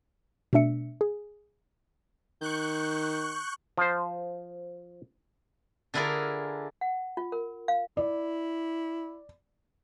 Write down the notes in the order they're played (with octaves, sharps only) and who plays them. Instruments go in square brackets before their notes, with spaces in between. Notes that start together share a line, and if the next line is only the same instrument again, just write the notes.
[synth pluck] B2 A3 D4 E5 C#7
G#4
[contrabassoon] D#3 [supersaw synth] C#6 F#6 G6
[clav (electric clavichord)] F3 C5
[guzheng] D3 D4 E4 F4 G#4 A#4
[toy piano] F#5
F4
A#4
F5
[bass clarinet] E4 [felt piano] D5